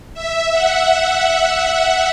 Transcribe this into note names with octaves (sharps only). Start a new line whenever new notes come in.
E5
F#5